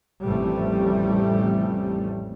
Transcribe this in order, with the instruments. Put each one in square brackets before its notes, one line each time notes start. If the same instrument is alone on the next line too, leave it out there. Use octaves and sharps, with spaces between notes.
[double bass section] A1 F2 C3 G3 A3